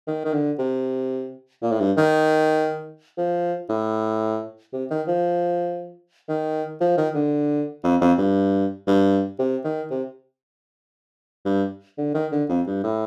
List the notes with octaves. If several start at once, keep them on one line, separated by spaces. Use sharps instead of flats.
D#3
D#3
D3
C3
A#2
A2
G2
D#3
F3
A2
C3
D#3
F3
D#3
F3
D#3
D3
F2
F2
G2
G2
C3
D#3
C3
G2
D3
D#3
D3
F2
G2
A2